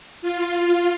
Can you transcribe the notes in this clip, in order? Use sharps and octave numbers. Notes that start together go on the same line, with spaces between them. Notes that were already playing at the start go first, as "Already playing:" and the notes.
F4